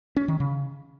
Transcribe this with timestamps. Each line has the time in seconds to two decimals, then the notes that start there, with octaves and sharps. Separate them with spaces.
0.17 C#4
0.28 D#3
0.40 C#3